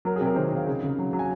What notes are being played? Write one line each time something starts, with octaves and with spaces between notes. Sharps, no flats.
F#3 A#4
G#4
C3
A#4
D#3 C5
C3
F5
C#3
C#3
F#3
F#3
G#5